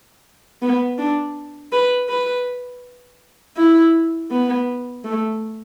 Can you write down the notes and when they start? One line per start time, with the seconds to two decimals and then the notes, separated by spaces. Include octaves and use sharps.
0.62 B3
0.99 D4
1.72 B4
2.09 B4
3.57 E4
4.31 B3
5.04 A3